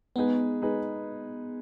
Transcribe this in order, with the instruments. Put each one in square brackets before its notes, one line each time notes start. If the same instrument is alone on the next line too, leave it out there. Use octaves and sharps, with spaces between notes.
[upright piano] G#3 D#4 G#4 B4 [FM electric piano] B3
[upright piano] G#3 D#4 G#4 B4